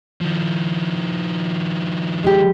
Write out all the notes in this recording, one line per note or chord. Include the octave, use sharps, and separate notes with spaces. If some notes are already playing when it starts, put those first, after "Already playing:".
D#3 F3
G#3 G4